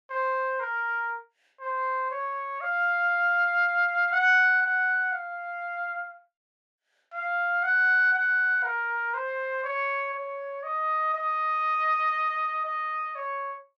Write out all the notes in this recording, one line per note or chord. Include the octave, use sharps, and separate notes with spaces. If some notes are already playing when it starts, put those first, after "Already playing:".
C5
A#4
C5
C#5
F5
F#5
F#5
F5
F5
F#5
F#5
A#4
C5
C#5
C#5
D#5
D#5
D#5
C#5